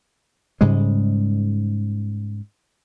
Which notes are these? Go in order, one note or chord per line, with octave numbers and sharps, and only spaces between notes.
G#2 C#3 G3 G#3